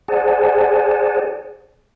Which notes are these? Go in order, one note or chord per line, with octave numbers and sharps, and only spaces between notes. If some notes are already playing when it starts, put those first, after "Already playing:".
G#4 C5 D5 F#5 G#5 A5